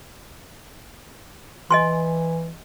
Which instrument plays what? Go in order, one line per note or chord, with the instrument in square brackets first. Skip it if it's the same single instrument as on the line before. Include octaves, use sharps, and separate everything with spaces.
[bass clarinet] E3 [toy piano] D#5 G#5 C6